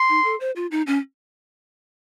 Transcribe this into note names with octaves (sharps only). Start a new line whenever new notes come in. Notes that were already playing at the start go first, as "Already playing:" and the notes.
Already playing: C6
D#4
A4
C5
F4
D#4
C#4